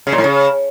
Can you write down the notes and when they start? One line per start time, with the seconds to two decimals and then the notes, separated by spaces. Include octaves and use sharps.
0.07 C#3
0.12 A#2
0.18 A2
0.24 C#3